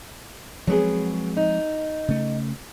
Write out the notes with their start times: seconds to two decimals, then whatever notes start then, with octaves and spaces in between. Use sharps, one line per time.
0.67 F3 F#3 G#3 B3 C4 G#4
1.36 D#4
2.08 C#3 A3